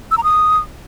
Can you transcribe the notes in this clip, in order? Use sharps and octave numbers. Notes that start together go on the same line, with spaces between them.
E6
A#5
D#6